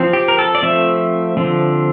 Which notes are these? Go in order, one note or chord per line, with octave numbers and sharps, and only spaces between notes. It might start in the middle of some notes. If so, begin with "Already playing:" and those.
Already playing: F3 C4
G4
A#4
A4
D5
F3 A3 C4 E5
D3 F3 C4